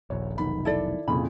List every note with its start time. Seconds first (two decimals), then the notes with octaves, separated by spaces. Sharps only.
0.10 D#1 A#1 C#5
0.38 F1 B1 D#3 B5
0.65 E4 A4 D5
1.08 C2 F2 A#2 C#3 B5